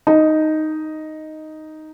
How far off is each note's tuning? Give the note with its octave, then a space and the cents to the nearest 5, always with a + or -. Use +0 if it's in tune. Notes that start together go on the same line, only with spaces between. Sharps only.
D#4 +0